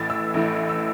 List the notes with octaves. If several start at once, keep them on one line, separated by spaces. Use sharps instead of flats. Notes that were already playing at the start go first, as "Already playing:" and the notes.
Already playing: A1 A2 E3 A3 E4 A6
E6
A1 A2 E3 A3 E4
E6